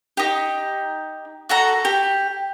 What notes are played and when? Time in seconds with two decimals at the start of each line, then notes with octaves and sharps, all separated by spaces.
0.17 D#4 G4
1.49 F#4 A4 A#5
1.85 G4